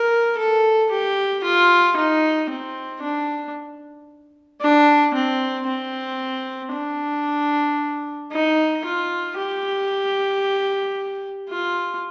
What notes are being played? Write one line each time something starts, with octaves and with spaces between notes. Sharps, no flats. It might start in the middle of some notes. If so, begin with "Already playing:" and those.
Already playing: A#4
A4
G4
F4
D#4
C4
D4
D4
C4
C4
D4
D#4
F4
G4
F4